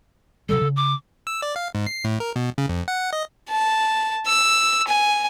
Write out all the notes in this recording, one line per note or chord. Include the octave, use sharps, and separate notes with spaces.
C3 F#3 G3 A4
C#3
D6
E6
D5
F5
G#2
C7
A2
A#4
B2
C#3
F2
F#5
D#5
A5
E6
G#5